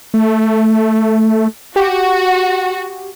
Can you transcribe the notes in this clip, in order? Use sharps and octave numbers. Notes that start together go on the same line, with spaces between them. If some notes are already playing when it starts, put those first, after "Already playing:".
A3
F#4 G4